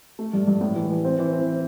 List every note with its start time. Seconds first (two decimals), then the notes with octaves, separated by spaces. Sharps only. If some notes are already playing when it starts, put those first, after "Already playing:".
0.19 A3
0.33 G2
0.47 G2
0.61 A2
0.75 E3
0.90 E3
1.04 C4
1.19 E3
1.33 C4